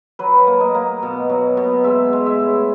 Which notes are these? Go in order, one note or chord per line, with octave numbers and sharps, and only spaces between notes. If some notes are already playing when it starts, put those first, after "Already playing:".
F#3 B4
A#3
D#5
A#3
B2
F#3
B2
G#3 E5
G#3
E5
A2